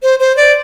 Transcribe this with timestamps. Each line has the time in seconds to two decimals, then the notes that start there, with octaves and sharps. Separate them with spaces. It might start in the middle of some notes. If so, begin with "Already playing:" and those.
0.03 C5
0.19 C5
0.37 D5